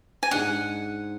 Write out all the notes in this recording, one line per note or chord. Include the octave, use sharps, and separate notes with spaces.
G#5
G#2 G#3 D4 F#5